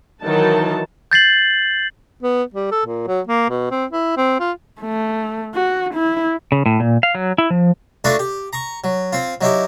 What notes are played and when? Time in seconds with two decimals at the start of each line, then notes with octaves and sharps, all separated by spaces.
0.24 D#3 E3 F#3 D#4 A5
1.12 G6 A6 C7 F#7
2.23 B3
2.54 G3
2.72 A4
2.86 A#2
3.08 F#3
3.27 A#3
3.50 B2
3.71 C4
3.92 E4
4.17 C4
4.40 F4
4.82 A3
5.55 F#4
5.94 E4
6.52 C#3
6.66 A2
6.80 A#2
7.03 F5
7.15 F#3
7.38 E4
7.50 F3
8.04 A3 D4 F4 F#4 A4 B4
8.19 G4
8.53 A#5 C#6
8.84 F#3
9.13 C4 F4
9.41 F#3 D#4 E4 G4